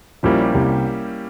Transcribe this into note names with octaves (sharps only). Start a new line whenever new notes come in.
A#1 A#2 G3 A#3 C#4 E4 G4
C2 C3